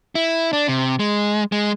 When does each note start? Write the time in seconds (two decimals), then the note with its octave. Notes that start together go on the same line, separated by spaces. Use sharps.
0.15 E4
0.53 D4
0.68 C3
0.99 G#3
1.52 G#3